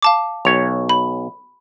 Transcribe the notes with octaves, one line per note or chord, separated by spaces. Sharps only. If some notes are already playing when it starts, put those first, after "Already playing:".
F5 A5 D6
B1 C#5 F7
B5